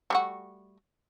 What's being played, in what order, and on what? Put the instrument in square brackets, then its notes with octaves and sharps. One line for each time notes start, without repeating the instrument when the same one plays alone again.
[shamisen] G3 A3 F#4